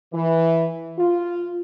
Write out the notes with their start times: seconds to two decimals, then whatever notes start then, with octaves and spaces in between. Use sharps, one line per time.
0.13 E3
0.98 F4